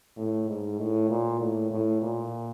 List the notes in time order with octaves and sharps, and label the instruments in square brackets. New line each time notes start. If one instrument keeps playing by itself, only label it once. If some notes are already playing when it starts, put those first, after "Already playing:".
[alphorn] A2
G#2
A2
A#2
A2
A2
A#2